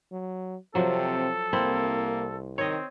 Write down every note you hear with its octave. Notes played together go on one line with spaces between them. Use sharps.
F#3
C3 F3 F#3 C4 A4
C2 A#3 C4 E4
D#3 C4 C#5 D#5